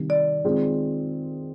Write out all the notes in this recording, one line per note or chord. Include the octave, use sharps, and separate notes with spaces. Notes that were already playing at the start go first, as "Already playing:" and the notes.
Already playing: C3 D#3 G3
D5
D#3 G#3 C4 F4 G#4